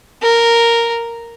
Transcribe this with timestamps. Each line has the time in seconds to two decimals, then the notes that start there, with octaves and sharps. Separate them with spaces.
0.22 A#4